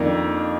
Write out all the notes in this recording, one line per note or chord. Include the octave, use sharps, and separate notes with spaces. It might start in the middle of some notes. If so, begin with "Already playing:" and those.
Already playing: F2 D#3 A#3 D4